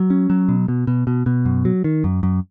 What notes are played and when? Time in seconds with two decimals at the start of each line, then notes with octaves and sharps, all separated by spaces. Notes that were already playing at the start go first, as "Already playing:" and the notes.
Already playing: F#3
0.10 C#4
0.30 F#3
0.49 B2
0.68 B2
0.87 B2
1.07 B2
1.26 B2
1.45 F#2
1.65 F#3
1.84 D#3
2.04 F#2
2.23 F#2